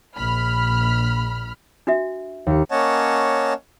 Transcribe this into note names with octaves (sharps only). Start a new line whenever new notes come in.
A#1 B5 F6
D4 F#4 E5
D#2 C#7
A#3 C#4 C#5 D#5 F#5 A5